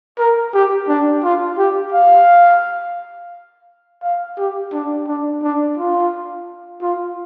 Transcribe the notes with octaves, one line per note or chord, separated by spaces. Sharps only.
A#4
G4
D4
F4
G4
F5
F5
G4
D4
D4
D4
F4
F4